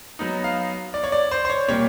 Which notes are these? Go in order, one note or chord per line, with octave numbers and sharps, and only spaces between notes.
F#3 B3 D#4
F5
D5
C#5
D5
C5
C5
C#5
A#2 G3 A#3 C#5